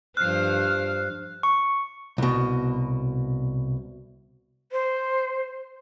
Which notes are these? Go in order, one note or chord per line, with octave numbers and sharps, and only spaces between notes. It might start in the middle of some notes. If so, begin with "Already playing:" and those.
G2 F3 C5 F6 F#6 C7
C#6
C2 B2
C5